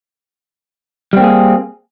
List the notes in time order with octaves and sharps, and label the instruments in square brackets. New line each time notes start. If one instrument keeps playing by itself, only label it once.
[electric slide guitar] G3
C4
A#3
G#4